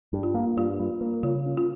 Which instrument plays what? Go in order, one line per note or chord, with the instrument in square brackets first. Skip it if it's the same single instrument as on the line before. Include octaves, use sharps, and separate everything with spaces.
[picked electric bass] G2
[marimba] F4
[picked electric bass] A#3
[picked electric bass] G2 [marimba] F4
[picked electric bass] G3
A#3
[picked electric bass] C#3 [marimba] F4
[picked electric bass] C#4
[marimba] F4